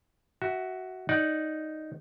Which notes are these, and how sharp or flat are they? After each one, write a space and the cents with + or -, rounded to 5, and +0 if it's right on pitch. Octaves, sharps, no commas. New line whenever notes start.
F#4 +10 E5 -10
D#4 +0 D5 +0 F#5 +0